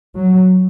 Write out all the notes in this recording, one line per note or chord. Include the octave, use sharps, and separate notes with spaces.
F#3